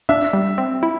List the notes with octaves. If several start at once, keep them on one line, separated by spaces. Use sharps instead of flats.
D4 E5
G3
C4
E4